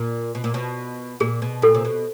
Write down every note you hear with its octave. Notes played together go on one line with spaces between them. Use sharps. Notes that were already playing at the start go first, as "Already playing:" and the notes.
Already playing: A#2
B2
A#2
B2
A#2 G#4
B2
A#2 A4
C3
B2